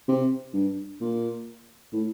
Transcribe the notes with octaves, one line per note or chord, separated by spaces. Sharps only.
C3
G2
A#2
A2